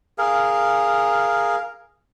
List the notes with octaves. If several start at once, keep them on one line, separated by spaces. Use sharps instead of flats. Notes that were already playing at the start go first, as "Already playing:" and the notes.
G#4 A#4 F5